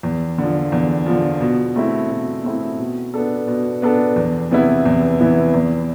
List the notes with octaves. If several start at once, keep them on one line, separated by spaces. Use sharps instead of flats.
E2
D3 F3
E2
D3 F3
B2
A3 C4 E4
B2
A3 C4 E4
B2
B3 D4 A4
B2
B3 D4 A4
E2
C3 E3 B3 E4
E2
C3 E3 B3 E4
E2